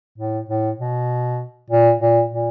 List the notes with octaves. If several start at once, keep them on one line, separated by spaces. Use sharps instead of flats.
A2
A2
B2
A#2
A#2
A#2